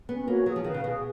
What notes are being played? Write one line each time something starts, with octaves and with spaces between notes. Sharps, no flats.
B3 C#4
A#3 F#4 C#5
F#3 G#4
F3
D#3 B4 F5
C#3
B2 G#4